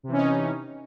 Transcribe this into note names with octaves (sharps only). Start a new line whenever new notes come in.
C3 E3 C#4 D#4